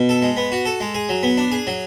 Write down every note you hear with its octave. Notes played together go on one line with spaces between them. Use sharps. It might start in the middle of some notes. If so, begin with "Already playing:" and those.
Already playing: B2
A4
G#3
B3
F#4
A4
G#3
G#4
F#3
B3
D4
G#4
F#3